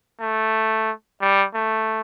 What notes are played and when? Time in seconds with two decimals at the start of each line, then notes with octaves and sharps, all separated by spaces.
0.21 A3
1.21 G3
1.54 A3